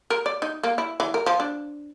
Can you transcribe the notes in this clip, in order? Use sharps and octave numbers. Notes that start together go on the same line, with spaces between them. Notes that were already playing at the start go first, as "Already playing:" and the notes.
A#4
D5
D#4
A#3
E4
E3
A#4
F3
D4